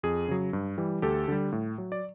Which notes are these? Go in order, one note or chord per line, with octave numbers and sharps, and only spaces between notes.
F2 G#4
C#3 F#3
G2
E3 G3
D2 G4 A4
D3 G3
A2
F#3
D5